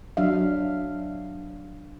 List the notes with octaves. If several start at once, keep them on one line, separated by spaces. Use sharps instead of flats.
F#3 D4 E5 F5